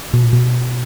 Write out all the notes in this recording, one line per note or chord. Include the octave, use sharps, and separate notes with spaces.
B2
A#2
B2